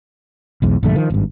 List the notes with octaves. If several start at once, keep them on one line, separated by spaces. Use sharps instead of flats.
B1 E2 G#2
A#1 G2 D3 A3
D#3 F3
G#1 G2